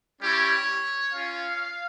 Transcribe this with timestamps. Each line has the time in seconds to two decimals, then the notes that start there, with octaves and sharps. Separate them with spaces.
0.20 G3 C#4 E4 G4 C#5
1.13 C#4 F4 F5